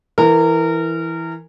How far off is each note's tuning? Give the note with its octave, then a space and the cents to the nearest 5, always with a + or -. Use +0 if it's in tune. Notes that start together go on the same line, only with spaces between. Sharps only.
E3 +0 A#4 -25